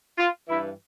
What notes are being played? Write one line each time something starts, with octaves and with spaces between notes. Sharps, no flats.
F4
G2 E3 E4